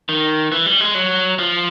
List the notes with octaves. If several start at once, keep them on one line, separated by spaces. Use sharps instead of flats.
D#3
E3
G3
G#3
F#3
F3